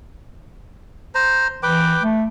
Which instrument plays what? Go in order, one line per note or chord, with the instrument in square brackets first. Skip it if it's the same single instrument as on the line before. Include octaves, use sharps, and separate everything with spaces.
[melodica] C5 A#5
[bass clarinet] E3 [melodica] B4 G5 D6
[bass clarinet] A3